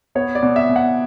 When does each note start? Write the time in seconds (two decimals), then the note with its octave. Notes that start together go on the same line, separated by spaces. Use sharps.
0.15 B3 C#5
0.35 D5
0.43 B2
0.56 E5
0.69 B2
0.76 F#5